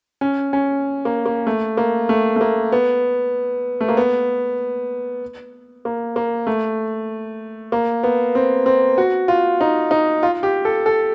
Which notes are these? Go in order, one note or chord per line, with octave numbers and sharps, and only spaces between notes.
C#4
C#4
A#3
A#3
A3
A#3
A3
A3
A#3
B3
A3
A#3
B3
A#3
A#3
A3
A#3
B3
C4
C4
F#4
F4
D#4
D#4
F4
G4
A4
A4